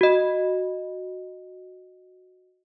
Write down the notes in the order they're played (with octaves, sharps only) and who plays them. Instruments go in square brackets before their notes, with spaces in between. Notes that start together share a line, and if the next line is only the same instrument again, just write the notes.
[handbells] F#4 D#5